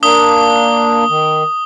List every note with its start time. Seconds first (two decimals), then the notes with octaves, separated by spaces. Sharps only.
0.03 A#3 D4 D#6 G7
1.10 D#3